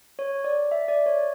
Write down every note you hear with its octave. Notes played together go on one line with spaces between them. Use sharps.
C#5
D5
E5
D5
C#5